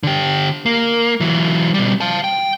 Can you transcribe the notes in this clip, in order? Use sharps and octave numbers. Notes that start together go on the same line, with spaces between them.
D3 G4
A#3
E3 F#3
B2 G3
F5 A5
G5